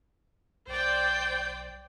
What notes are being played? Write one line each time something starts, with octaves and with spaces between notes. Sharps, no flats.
B1 C5 D5 G5